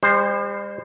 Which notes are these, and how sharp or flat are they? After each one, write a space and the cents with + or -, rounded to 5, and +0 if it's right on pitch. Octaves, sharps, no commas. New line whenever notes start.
G3 +45 C5 +0